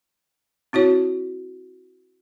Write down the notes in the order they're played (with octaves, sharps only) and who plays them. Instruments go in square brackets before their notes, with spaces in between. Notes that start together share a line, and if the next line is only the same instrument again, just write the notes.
[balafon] C4 E4 F#4 C#5